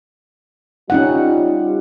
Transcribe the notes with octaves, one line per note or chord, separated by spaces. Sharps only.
G3 C#4 D#4 F4 F#5